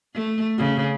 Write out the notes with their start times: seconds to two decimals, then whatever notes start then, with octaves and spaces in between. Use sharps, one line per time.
0.14 A3
0.58 C#3